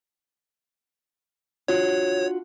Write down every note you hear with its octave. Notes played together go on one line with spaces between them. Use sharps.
D4 F4 F#4 C#5